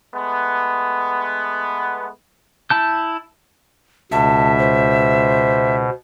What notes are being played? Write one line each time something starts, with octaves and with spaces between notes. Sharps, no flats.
G#3 A3 B3
E4 A5 G6
C#2 B2 E5 A5
C5